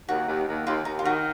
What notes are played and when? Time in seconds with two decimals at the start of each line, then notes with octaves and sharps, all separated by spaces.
0.09 D#2 F#4
0.28 D#2
0.48 D#2
0.67 D#2 F4
0.85 D#2 D#4
0.99 F4
1.05 D#3 F#4